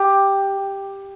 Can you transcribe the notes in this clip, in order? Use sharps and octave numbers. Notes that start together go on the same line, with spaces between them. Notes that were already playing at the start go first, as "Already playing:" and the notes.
Already playing: G4